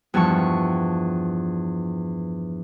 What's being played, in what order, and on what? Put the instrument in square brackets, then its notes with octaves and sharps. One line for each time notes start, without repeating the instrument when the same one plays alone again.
[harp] E2 G2 F3 A5 C#6